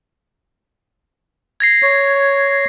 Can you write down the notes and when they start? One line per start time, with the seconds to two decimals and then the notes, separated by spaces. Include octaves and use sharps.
1.60 G#6 A#6 C7
1.83 C#5